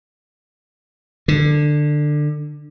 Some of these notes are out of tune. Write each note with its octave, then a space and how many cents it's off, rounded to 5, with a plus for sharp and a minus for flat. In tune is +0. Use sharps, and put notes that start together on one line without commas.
D3 +20